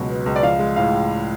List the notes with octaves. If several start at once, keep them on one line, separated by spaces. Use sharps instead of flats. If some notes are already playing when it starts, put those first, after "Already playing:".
Already playing: C#2 B2 F#3
B3
C#2
D5
F3 F5
G#3
A2 F5